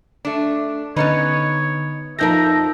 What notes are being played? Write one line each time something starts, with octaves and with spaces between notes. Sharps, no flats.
A3 D4
D3 B3 C#4 D#4 B4 C#5 C#7
F2 F3 D#4 A#4 E5 G6 A#6